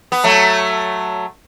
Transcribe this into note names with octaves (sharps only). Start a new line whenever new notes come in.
B3
F#3 A3